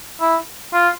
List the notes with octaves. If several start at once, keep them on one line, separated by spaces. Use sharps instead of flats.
E4
F4